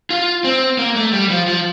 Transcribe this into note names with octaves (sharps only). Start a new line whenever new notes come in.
F4
C4
A#3
A3
G3
F3
F3